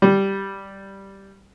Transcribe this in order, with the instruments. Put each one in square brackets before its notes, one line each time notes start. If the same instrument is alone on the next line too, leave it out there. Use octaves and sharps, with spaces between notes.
[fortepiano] G3